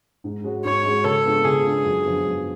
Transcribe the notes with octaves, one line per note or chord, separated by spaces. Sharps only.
G#2
G#3 C#4 F#4
G#2 C#5
G#3 C#4 F#4
C#3 A4
G#3 B3 D4 F4
C#3 G#4
G#3 B3 D4 F4
F#2
D3 F3 B3
F#2